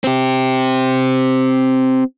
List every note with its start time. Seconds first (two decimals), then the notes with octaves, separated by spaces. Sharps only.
0.04 C4 G4